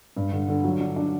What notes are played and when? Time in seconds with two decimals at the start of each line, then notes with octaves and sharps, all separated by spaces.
0.16 G2
0.32 D3
0.48 D3
0.64 F#3
0.80 D4
0.96 D4